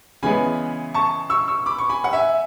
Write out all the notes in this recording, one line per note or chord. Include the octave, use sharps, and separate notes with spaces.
C#3 E3 G#3 B3 G#5 B5
A5 C#6
C#6 E6
C#6 E6
B5 D6
C#6
G#5 B5
F#5
E5 G#5